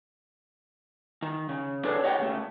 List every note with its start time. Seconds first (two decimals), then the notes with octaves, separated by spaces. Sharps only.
1.22 D#3
1.49 C#3
1.85 D4 G#4 A4 B4 C#5 A5
2.03 G4 C#5 D#5 F#5 G5
2.19 C#2 C#3 A3